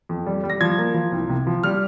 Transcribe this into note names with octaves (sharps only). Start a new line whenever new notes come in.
F2
G3
G3
A#6
F3 G#6
A#3
F3
C2
C3
F3
G3 F6